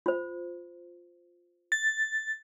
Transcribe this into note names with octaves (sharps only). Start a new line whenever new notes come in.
F4 C5
A6